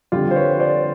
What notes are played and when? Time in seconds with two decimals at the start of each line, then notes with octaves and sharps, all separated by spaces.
0.12 F2 D3 G3 F4 G4
0.31 C5
0.36 B4 C#5
0.60 C5 D5